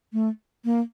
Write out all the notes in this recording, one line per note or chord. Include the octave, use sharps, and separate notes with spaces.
A3
A#3